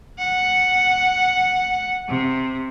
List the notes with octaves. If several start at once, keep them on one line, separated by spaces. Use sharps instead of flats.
F#5
C3